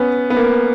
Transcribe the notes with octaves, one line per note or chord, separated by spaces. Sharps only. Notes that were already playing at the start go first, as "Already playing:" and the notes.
Already playing: B3 C#4
B3
A#3